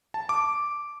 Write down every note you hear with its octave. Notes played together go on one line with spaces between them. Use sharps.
A5
D6